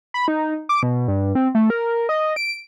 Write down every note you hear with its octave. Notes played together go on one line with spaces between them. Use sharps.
B5
D#4
D6
B2
G2
C4
A3
A#4
D#5
D7